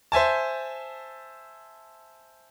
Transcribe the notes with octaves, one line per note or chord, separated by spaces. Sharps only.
C5 E5 G#5 A5